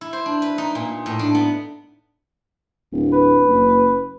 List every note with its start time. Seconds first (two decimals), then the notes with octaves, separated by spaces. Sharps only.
0.01 E4
0.13 C5
0.26 D4
0.42 B4
0.58 D#4
0.75 A#2
1.06 A2
1.19 D4
1.35 B3
2.92 D1
3.13 B4
3.48 F#1